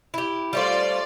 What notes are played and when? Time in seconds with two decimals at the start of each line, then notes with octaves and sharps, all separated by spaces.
0.14 E4 G4
0.53 G3 A3 F4 C5 D5